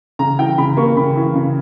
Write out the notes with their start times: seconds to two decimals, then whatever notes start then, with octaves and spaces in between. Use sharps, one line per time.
0.19 C#3 A#5
0.39 E3 G5
0.58 C#3 B5
0.77 A#3 C#6
0.97 C#3 B5
1.16 E3
1.35 C#3